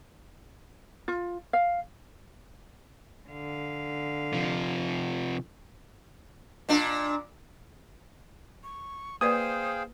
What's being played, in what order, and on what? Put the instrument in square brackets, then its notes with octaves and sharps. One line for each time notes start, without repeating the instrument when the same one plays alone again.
[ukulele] F4
F5
[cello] D3 F5
[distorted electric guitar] C3 F3
[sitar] A#2 D4
[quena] C#6
[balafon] A#3 B4 D5 [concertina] G#4 F5 G5 [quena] C5 [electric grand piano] D#6